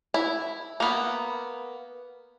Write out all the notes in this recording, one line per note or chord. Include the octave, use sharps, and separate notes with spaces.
E4
A#3 B3